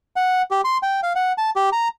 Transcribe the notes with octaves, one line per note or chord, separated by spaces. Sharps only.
F#5
G4
C6
G5
F5
F#5
A5
G4
A#5